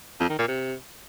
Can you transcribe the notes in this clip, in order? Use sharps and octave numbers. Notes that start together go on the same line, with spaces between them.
F2
D#3
A#2
C3